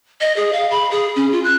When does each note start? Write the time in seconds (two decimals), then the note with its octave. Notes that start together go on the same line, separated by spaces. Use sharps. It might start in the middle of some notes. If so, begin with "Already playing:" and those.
0.21 D#5
0.36 G#4
0.53 F5
0.71 B5
0.91 G#4
1.16 C#4
1.32 F4
1.44 F#6